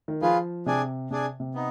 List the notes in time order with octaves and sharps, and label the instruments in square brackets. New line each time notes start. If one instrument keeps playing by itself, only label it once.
[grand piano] D#3
[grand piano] F3 [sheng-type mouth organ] F4 G#4 B4 F5
[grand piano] C3 [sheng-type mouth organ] D4 G#4 D5 G#5
[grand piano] C3 [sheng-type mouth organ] D4 G#4 D5 G#5
[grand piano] C3
[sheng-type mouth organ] B3 D#4